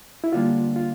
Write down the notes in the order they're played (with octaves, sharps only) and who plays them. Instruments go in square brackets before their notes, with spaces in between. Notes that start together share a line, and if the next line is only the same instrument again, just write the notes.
[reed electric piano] E4
[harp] D3 G3 A#3 [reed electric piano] F4
[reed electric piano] F4